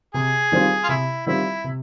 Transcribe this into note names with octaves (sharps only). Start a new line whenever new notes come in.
C3 G#4
D#3 G3 C4 F4
F4
C3 E4
D#3 G3 C4 E4 F4
C3